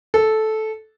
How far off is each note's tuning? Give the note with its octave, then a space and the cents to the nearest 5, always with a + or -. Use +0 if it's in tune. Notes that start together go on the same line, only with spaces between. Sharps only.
A4 -10